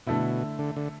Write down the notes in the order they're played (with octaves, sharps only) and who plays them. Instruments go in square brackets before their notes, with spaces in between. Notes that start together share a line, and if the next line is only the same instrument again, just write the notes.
[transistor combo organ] B2 [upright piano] D3 A3 E4
[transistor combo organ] D3
D3